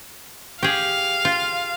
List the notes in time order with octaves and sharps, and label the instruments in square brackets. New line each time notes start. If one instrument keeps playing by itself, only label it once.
[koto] G4 G#4 [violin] F5
[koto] F4